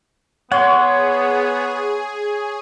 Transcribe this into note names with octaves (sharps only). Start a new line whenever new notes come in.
B3 G#4 C#5 F#5 C6